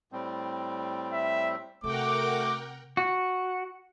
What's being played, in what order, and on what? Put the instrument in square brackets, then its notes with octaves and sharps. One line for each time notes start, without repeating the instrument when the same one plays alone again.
[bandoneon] A2 G3 C4
[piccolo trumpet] E5
[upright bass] C3 [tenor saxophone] A3 [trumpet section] F#4 D6 [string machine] A#4 F#5 G5
[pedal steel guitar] F#4